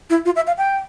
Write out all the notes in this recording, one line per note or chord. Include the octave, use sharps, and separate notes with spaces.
E4
F4
E5
F5
G5